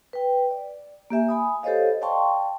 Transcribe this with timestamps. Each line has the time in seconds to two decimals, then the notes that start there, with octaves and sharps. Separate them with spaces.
0.13 B4 G5
0.51 D5
1.10 A#3 G4 E5 G#5
1.29 G#5 B5 D#6
1.63 G4 A4 C5 C#5 D#5 F5
2.02 D5 F5 G5 A5 C6 C#6